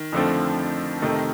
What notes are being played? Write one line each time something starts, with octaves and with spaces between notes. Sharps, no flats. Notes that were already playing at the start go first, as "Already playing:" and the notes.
Already playing: D#3
F2 D3 F3 A3 C4
F2 C3 D#3 A3